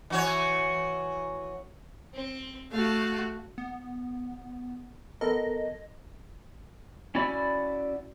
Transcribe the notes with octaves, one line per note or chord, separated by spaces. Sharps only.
E3 F#4 C#5
C4
A3 F#4 F5 A5
B3
B3 A4 A#4 D#5
C#4 E4 F#4 D5 B5